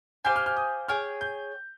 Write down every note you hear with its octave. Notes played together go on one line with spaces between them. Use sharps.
G4 C5 F5 G#5 G6
F6
F6
D#6
G#4 C#5 G5 F6
G6